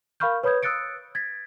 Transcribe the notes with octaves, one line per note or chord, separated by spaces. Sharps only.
A#4 F5 B5 C#6 F6 G6
B4 C#5 B5 D#6 G6 G#6
D#6 E6 F#6 A6 C#7 D7
G#6 A6 B6